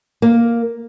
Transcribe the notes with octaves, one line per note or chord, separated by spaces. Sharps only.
A#3